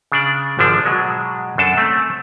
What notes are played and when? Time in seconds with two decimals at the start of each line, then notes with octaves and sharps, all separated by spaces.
0.12 C#3 D4 D5
0.59 G#1 D3 F3 D4
0.86 B2 F#3 G#3
1.58 F#2 D4 A4 A5
1.77 A3 C4